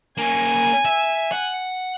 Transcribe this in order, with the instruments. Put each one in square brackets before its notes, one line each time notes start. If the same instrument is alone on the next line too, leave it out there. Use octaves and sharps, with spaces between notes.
[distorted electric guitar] A#3 C#4 [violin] G#5
[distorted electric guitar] E5
F#5